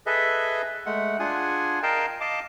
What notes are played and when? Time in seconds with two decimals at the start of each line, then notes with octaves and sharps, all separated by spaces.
0.06 G#4 A4 B4 D#5 E5
0.86 G#3 A3 F#5
1.19 D4 F4 G#4 F#5 G#5
1.83 A#4 D#5 F5 G5 A5
2.21 D#5 F5 A5 D6